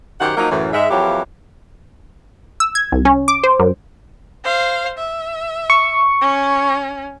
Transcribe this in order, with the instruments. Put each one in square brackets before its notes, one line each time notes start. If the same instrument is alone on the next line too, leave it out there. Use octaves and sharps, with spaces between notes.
[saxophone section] F#2 D#3 G4 C5 F#5
F3 F#3 A#3 D#4
F#2 A2 E3
G#2 G#3 E5
F2 E3 F#3 A#3 E4 G4
[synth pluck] E6
G#6
C2
C#4
D6
C5
F#2
[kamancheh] C5 F5
E5
[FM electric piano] C#6
[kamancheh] C#4